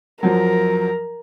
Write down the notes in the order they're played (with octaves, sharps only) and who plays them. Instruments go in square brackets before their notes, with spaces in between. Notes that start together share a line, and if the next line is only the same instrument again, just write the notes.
[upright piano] F#2 F3 F#3 [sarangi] A#4